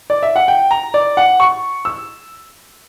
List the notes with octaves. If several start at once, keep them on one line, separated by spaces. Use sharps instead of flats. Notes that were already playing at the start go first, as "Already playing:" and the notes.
D5
E5
F#5
G5
A#5
D5
F#5
C#6
E6